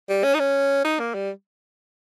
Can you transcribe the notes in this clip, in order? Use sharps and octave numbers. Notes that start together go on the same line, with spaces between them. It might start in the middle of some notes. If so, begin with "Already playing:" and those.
G3
C#4
D#4
C#4
D#4
A#3
G3